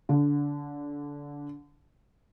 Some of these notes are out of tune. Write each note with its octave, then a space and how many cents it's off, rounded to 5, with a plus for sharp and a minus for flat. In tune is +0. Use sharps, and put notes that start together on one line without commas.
D3 -20